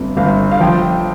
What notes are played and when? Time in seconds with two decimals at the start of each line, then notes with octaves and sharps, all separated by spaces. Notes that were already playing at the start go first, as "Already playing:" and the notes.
Already playing: G1 F2
0.17 G1 F5
0.51 F5
0.60 F3 G5